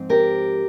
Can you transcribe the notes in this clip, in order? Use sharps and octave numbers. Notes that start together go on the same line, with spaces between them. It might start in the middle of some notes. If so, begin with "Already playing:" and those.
Already playing: G#2 F3 C4
G4 A#4